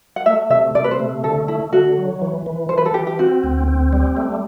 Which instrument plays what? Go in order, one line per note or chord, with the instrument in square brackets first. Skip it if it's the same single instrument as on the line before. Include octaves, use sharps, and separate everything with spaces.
[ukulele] F#5
[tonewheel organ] A3 [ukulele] E5
[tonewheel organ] C3 [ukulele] E5
[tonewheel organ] C3 [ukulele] D5
[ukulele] B4
C5
[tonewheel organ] A3
[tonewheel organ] D3 [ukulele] A4
[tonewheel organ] A3 [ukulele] E4
[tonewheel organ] D3 [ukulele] F#4
[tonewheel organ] F#3
E3
E3
[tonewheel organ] E3 [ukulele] C5
[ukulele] B4
A4
[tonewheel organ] E3 [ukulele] G4
[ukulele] G4
[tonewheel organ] C4 [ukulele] F#4
[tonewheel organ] D2
C4
G3
A3